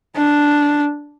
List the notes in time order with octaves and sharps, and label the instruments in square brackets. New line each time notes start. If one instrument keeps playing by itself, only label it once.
[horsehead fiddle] D4